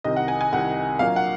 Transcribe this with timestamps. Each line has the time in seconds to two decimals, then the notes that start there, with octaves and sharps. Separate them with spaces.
0.04 C2 C3 D#3 D#5
0.16 F#5
0.28 G#5
0.41 G#5
0.53 C2 C3 D#3 F#5
0.99 A#1 A#2 F#3 A#3 F5
1.16 F#5